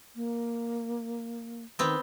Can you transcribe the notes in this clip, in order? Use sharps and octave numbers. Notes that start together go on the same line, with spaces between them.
A#3
D#3 B3 C4